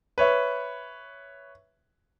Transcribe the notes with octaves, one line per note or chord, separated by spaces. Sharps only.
B4 C#5 E5